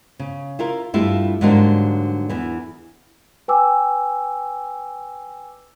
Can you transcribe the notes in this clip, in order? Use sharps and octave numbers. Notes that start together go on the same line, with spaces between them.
C#3
E4 F4 A#4
G2 A3 E4 F4 G4 F5
G#2 D3 F#3 G3 A#3 D4
E2 E3
B4 G5 G#5 D6 E6